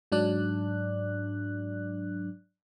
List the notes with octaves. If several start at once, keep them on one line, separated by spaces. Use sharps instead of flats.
G#2 F#3 D4 D5 F#6